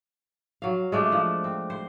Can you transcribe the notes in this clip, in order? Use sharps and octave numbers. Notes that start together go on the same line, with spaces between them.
F#3 F5
G#3 A3 D4
F3
C4
C5